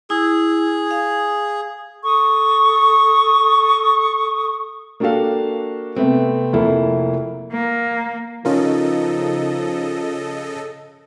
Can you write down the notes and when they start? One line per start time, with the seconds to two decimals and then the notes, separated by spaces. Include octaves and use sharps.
0.10 E4 G#4
0.91 F5
2.04 A4 C#6 D#6
5.00 A#3 D4 F#4 G4 A4 F5
5.96 C3 A3 B3 C4
6.53 F1 A#3 E4 A4
7.52 A#3
8.45 C#3 F3 C#4 D#4 F4 A4 A#4 D#5